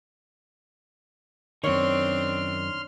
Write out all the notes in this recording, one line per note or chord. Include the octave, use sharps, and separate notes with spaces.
F#2 D#3 C4 D4 C#5 C6 F6